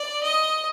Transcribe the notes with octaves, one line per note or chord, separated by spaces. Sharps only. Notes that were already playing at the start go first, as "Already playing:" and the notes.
Already playing: D5
D#5